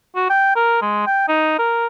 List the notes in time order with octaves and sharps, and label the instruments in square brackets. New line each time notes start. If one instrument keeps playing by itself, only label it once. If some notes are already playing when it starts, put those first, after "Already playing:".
[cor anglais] F#4
G5
A#4
G#3
G5
D#4
A#4